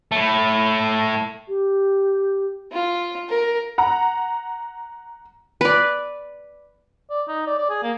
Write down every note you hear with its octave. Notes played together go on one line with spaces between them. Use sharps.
A2 A3
G4
F4
A#4
F#5 A#5
B4 D5
D5
D#4
D5
D5
G#4
A#3